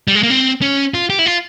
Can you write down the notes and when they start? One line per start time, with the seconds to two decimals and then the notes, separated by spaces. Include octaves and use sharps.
0.08 G3
0.15 G#3
0.23 A#3
0.30 C4
0.62 C#4
0.94 F4
1.10 G4
1.19 E4
1.26 F4